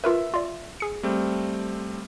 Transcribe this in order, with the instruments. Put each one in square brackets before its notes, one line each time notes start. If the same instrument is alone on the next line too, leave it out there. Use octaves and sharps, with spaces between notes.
[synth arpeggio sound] F4 A#4 B4 [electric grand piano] E5
[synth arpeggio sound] F4 D5
G#4 C#7
[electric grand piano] G3 A3 C4